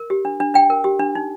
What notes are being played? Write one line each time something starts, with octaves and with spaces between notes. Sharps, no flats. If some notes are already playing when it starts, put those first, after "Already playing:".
Already playing: A#4
G4
D4
D4
D4 G5
A#4
G4
D4
D#4